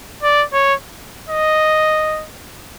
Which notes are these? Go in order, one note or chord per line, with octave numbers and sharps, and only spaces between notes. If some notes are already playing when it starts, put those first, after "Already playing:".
D5
C#5
D#5